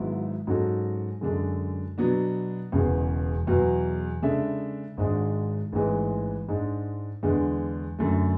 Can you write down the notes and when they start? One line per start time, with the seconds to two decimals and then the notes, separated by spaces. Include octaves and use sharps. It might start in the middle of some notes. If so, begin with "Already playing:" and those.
Already playing: G#1 G#2 F#3 B3 E4
0.47 G#2 F#3 C#4 F#4 A4
1.21 F#2 D3 G#3 D4 A4
1.98 B2 F#3 B3 D4
2.72 E1 E2 C#3
3.47 E2 B2 F#3
4.22 C#3 G#3 D4 A4 E5
4.97 G#1 G#2 G#3 D4 G#4
5.73 A1 G#2 E3 G#3
6.48 G#2 G#3 D4
7.23 E2 D3 G#3 D4
7.99 F#2 D3 A3